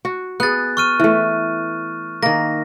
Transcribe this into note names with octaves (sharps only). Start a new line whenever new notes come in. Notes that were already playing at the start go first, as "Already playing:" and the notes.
F#4
B3 G#4 F#6 A6
C#6 F6 D#7
E3 A3
D#3 A#3 A#6